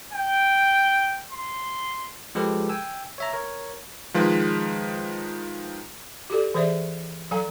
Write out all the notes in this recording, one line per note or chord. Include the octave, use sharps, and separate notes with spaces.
G5
C6
F3 G#3 G4 A4 B4
G5 G#5 E6
C#5 E5 A#5
A#4 C#5
D#3 F3 G#3 B4
F#4 G4 A4 D5
E3 G#4 C5 D5 E5
F#3 A4 F5 G#5 A#5